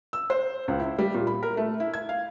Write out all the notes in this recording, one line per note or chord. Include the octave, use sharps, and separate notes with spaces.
E6
C5
C#2
E4
G3
A#2
B5
A#4
A3
E4
G#6
F5